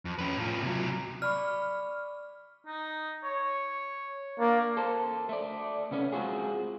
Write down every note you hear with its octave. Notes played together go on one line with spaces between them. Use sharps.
F2
C#4 B4
A2 F4
C3 F#3
D5 B5 C#6 F6
D#4
C#5
A#3 D4
A4 C5
A3 D5
C3 B3 C#4
G#3 C4 F4 F#4 G#4